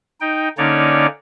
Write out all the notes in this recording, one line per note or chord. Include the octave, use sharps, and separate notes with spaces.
D#4 G5
D3 A#3 C#4 D#4 C#5 D5